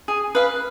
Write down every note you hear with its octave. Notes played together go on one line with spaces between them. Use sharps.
G#4
B4 F5